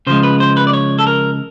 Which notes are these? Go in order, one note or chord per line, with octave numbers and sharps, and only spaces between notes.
C#3 F3 G#3 C5
B4
C5
B4
D5
C#5
A4
A#4